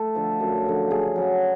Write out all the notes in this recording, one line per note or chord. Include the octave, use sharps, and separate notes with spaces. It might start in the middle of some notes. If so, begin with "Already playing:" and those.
Already playing: A3 A4
D3 F3
F#2
D3 F3
C#3 G#4
F#3 C#4